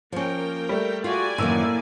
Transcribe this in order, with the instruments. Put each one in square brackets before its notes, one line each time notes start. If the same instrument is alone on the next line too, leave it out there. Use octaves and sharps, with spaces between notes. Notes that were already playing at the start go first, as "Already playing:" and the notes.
[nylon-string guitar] F3 C#4 [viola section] A#3 A#4 G5
[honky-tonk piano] G3 A3
[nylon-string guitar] F4 [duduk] F#4 [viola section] D5 G#5
[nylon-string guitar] F#2 D#3 E3 [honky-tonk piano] A2 E6 D#7 [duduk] A#3